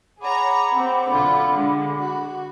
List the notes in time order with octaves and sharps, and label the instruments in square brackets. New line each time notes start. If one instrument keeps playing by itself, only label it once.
[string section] G#4 C#5 A#5 [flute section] F#5 B5 D6
[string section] C4
B1 D3 F4
D3 G#3
F#4